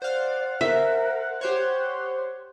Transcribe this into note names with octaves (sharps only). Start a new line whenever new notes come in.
C5 D5 F5 F#5
A#4 E5
G4 C5 C#5 C6